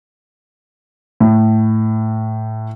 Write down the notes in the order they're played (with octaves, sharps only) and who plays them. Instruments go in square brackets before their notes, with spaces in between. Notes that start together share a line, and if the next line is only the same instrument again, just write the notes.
[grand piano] A2